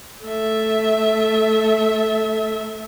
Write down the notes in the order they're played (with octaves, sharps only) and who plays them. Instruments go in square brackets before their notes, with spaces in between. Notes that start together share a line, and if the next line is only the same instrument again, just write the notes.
[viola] A3 E5